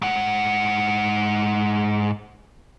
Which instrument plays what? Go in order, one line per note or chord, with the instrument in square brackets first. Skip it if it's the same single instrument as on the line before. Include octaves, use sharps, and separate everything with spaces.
[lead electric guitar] G#2 F#5